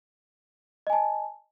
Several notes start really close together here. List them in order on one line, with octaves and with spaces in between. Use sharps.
D#5 G#5 A5